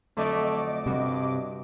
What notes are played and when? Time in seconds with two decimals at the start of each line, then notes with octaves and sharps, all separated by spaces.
0.17 F2 D3 F#3 A3 D#5 D6
0.86 G2 C3 E3 G3 F#4